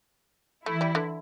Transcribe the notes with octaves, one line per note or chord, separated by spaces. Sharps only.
E3 A3 E4
G3
D3